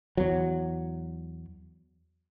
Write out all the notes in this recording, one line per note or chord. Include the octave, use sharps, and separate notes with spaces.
E2 F#3